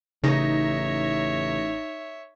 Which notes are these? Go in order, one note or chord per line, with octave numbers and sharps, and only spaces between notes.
A1 C#3 D#4 C#5 E5 A#6